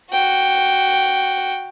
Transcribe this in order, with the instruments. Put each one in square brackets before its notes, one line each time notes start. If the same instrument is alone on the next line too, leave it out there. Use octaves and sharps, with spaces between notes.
[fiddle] F#4 G5